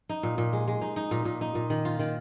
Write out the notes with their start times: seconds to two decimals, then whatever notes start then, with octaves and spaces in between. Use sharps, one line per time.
0.09 D#4
0.23 A#2
0.38 A#2
0.53 G#3
0.68 G#3
0.81 D#4
0.96 D#4
1.11 A#2
1.25 A#2
1.41 D#4
1.55 A#2
1.70 D#3
1.85 F4
1.99 D#3